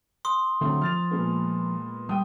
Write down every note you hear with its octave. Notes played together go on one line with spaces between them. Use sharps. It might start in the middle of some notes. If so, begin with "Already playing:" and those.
C6 D#6
D3 F#3 A3 C4
F3 F6 A6 F7
A#2 G#3 B3
G3 G5 D#6